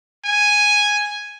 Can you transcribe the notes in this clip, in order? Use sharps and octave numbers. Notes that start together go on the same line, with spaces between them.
G#5